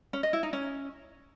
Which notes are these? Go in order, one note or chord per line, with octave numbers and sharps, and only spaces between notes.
C#4
D#5
E4
D#4
C#4